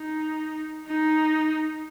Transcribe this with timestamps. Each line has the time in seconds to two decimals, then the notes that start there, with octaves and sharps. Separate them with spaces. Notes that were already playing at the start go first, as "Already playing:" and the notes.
Already playing: D#4
0.88 D#4